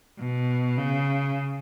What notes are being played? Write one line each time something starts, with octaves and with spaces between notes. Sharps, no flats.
B2
C#3